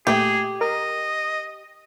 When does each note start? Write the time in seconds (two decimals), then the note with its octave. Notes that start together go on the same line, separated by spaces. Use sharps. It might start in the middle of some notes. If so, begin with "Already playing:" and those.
0.07 A#2 A3 G4 G#4
0.61 A#4 D#5